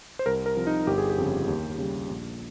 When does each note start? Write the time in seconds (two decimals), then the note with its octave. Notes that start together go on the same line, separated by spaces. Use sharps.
0.19 C5
0.26 C2 A#4
0.46 A#4
0.57 C3 F3
0.67 D#4
0.87 G1 G4
0.98 G#4
1.10 G4
1.18 F2 C#3
1.48 D#2
1.78 C#3 G3
2.09 A#1